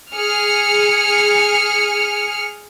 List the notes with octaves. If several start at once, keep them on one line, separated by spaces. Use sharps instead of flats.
G#4 F6 C#7